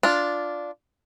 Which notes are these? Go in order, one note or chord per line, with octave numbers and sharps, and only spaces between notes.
D4 F4